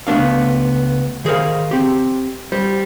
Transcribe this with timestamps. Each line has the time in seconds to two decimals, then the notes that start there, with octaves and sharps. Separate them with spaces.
0.07 C#2 A3 B3 D4 F5
1.25 D#3 G#4 A#4 C5 F5
1.71 C4 G4
2.52 G3 C5